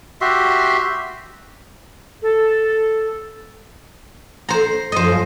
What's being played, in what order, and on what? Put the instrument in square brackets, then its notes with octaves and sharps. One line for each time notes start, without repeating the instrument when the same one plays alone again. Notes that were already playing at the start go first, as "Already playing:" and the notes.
[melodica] F#4 G4 E5 C6
[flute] A4
[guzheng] C5 A#5
[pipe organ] F#2 F3 [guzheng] C5 D#5